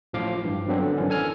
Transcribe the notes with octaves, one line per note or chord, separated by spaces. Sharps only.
A1 A2 F3 F5 D6
G2
F#2 F#3 B3 C4 D4
D3
G#1 F#2 E3 C#4
A4 G#5 F6